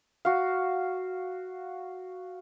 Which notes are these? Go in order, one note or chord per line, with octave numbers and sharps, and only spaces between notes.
F#4 F5